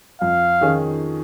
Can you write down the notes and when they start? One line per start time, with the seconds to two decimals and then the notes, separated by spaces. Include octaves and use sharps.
0.21 F2 F5
0.61 D#3 C#4 G#4